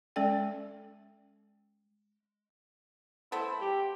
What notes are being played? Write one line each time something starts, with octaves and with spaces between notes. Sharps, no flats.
G#3 C#4 A4 D5 G5
A3 B3 E4 C5
G4